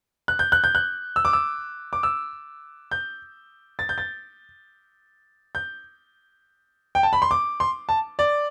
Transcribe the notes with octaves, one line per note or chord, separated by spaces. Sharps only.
F#6
G6
F#6
G6
F#6
E6
D6
E6
D6
E6
G6
A6
G6
A6
G6
G5
A5
B5
C6
D6
C6
A5
D5